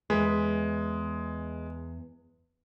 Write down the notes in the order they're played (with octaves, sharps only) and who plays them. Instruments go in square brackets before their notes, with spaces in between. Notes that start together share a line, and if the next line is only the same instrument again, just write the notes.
[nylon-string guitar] E2 B4 [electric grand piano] G#3